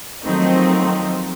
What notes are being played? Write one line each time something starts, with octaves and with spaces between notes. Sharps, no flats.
D#3 F3 F#3 A3 C4 D#4